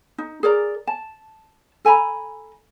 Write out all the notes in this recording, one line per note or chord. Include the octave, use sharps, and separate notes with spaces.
D#4
G#4 A#4 D5 A#5
A5
A4 G#5 A#5 B5